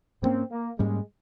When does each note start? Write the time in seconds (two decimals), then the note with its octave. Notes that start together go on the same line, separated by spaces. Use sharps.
0.22 G#2 G3 A#3 C4 C#4
0.51 A#3
0.79 G#2 G3 G#3 A#3 C#4